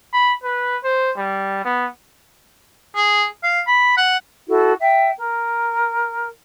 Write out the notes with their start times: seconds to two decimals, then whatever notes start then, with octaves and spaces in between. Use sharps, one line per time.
0.13 B5
0.44 B4
0.84 C5
1.17 G3
1.65 B3
2.96 G#4
3.43 F5
3.68 B5
3.97 F#5
4.47 E4 F#4 A4
4.78 E5 G5
5.17 A#4